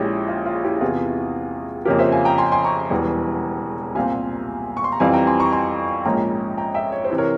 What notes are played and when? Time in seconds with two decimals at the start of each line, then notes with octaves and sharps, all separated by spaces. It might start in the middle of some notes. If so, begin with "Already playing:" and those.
Already playing: A#1 A#2 G#3 C#4 E4 G4
0.29 F4
0.46 F4
0.64 E4 G4
0.81 E2 C3 E3 F4 G#4
1.85 F2 C#3 F3 A#3 C#4 G4 A#4
1.99 C5 E5
2.12 F5 G#5
2.25 G5 A#5
2.38 G#5 C6
2.52 G#5 C6
2.65 A#5 C#6
2.90 E1 E2 E3 G3
3.95 C2 A#2 G3 C4 F5 G#5
4.77 C#6
4.84 C6
4.92 A#5
5.00 F2 E3 G3 C4 F5 G#5
5.13 G5 A#5
5.27 G#5 C6
5.39 A#5 C#6
5.52 G#5 C6
6.05 A#1 G#2 F3 A#3 C#4 G5 A#5
6.58 G5 A#5
6.74 E5 G5
6.92 C#5
7.05 C5
7.10 C3 E3
7.18 A#4 C#5